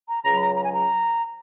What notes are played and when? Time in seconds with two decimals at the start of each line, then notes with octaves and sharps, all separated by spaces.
0.09 A#5
0.24 C#2 C#3 F#3 A#5
0.36 B5
0.40 A#5
0.56 A#5
0.64 G#5
0.73 A#5